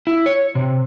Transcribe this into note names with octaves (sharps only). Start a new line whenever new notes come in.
E4
C#5
C3